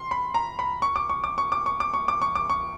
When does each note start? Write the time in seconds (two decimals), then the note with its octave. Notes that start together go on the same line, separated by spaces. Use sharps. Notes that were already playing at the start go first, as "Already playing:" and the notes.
Already playing: C6
0.11 B5
0.34 A#5
0.59 B5
0.82 C#6
0.96 D6
1.09 C#6
1.24 D6
1.38 C#6
1.52 D6
1.66 C#6
1.80 D6
1.94 C#6
2.08 D6
2.22 C#6
2.35 D6
2.50 C#6